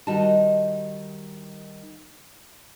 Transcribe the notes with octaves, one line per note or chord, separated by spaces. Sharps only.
D#3 G3 D#4 F#4 D#5 A5